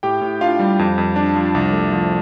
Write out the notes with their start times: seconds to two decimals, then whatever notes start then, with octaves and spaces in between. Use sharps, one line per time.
0.03 A2 G4 G5
0.21 A2
0.41 D4 F4 F5
0.59 G3
0.79 F2
0.98 F2
1.16 D4
1.36 F3
1.55 C2
1.73 A3
1.92 F3